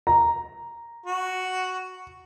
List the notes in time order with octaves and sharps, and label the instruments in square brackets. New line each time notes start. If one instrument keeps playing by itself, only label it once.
[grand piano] A#5
[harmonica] F#4